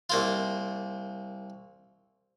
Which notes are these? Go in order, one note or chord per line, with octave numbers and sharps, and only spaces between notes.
C2 A#3 F4